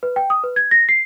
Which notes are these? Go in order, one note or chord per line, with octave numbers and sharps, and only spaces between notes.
B4
G5
D#6
B4
G#6
A#6
C7